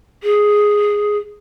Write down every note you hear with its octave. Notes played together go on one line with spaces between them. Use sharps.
G#4